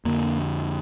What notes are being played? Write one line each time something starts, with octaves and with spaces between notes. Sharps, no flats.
F2 D3 A#3